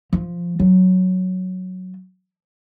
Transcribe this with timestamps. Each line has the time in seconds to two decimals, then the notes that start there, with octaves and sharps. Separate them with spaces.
0.13 F3
0.60 F#3